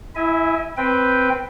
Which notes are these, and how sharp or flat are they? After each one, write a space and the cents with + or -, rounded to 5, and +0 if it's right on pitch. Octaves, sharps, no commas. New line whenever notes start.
E4 +0 E5 -40 G#5 +0
C4 +0 B4 +0 G5 +0